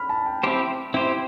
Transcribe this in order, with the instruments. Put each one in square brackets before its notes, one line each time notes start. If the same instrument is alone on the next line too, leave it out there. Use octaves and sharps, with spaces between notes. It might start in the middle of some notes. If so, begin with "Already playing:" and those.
Already playing: [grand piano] B5 F6
A5
G5
[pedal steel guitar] C4 E4 G4 C5
C4 E4 G4 C5